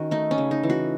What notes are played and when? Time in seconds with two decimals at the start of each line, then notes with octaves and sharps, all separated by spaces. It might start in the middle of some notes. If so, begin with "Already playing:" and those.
Already playing: D#3 C#4 F#4
0.11 A3 D#4
0.31 C#4
0.38 C#3
0.51 D#4
0.63 E3
0.70 F#4